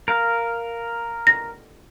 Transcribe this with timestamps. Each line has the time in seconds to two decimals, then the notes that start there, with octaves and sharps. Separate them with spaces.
0.08 A#4 F5
1.27 A#6